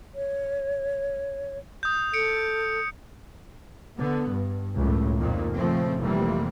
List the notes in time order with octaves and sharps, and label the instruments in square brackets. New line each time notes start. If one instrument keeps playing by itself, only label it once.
[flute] C#5
[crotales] D#6 G6
[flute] A4 [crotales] C#7 D7
[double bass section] D3 B3
G2
C#2 F#2 A2
F2 A#2 D#3 A#3
C#3 F3 A3 C4
F1 F2 C3 E3 G3 A#3